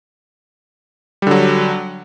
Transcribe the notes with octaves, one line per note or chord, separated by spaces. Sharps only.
D3 F#3 G3